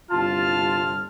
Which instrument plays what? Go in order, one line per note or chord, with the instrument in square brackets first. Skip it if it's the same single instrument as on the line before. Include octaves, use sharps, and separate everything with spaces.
[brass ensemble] G1 C2 A5 [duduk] F4 [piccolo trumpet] F6